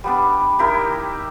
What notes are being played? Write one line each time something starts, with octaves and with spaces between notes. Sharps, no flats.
G3 B3 D4
D#4 E4 G4 A#4